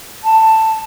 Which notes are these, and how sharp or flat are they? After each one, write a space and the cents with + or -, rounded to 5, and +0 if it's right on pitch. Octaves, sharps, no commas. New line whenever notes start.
A5 +10